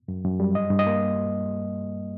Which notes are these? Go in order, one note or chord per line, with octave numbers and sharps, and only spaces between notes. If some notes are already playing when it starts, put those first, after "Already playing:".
F#2
F#2
G3
G2 D#5
G2
D#5
A#3